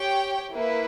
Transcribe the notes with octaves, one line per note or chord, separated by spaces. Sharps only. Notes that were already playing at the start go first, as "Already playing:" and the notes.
Already playing: G4 C#5 G5
A#3 E4 B4